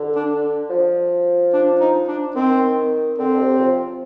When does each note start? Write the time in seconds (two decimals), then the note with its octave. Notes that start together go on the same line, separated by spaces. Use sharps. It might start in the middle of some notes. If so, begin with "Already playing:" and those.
Already playing: D3
0.16 D4
0.70 F3
1.53 D4
1.80 D#4
2.08 D4
2.35 D#3 C4
3.18 D3 C4
3.39 C3
3.59 F3